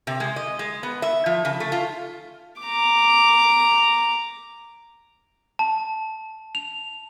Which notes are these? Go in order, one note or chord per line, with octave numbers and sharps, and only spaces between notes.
C3
G#3
D#5
G#3
B3
E5
F3
C#3
A3
F4
A#5 D6
A5
F7